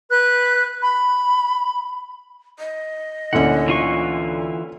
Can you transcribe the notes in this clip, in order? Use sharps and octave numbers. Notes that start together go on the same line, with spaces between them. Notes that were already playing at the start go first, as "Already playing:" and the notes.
B4 F#6 G6
B5
D#5
D2 A#2 D3 C#4 E4 F#5
E3 F4 C#6